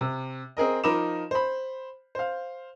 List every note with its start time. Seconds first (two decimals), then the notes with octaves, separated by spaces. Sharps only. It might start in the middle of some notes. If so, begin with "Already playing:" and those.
0.01 C3
0.57 C4 G#4 A#4 D#5
0.84 F3 D#4 A#4 B5 D6 E7
1.31 C5 B5
2.15 C5 F5